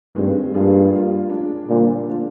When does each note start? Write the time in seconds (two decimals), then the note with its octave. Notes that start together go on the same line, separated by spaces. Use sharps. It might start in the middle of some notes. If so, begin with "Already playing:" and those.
0.16 G2 D#3 G#3 C4
0.53 G2 F3 A#3 F4 G#4 D5
0.92 G3 A#3 F4
1.30 F3 G#3 D4
1.68 A#2 D3 G3 D4 F4 C5
2.06 A#2 F3 G#3 D4 F4